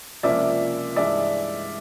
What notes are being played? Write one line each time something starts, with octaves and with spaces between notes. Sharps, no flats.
C#2 C3 F3 A#3 C#4 D5 E5
G2 E3 G#3 D5 E5